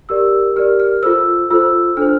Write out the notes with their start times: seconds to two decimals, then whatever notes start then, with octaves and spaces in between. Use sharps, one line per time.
0.09 G4 A#4 D5 E6
0.56 G4 A#4 D5 F6
0.80 F6
1.03 F4 A4 C5 E6
1.50 F4 A4 C5 E6
1.97 D4 A4 C5 F6